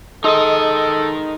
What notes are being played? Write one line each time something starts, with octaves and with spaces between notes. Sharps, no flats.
G#3 D#4 A4 A#4 D#5